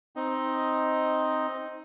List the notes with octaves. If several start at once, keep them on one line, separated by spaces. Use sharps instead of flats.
C4 D#4 D#5